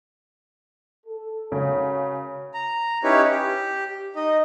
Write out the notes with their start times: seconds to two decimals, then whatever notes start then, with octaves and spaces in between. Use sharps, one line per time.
1.07 A4
1.52 C#3 F#4 A#4 C#5
2.54 A#5
3.04 C#4 D#4 E4 G4 B4 C#5
3.31 G4
4.16 D#4 D#5